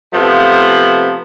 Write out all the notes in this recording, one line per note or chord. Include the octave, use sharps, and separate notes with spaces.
C3 F3 A3 B3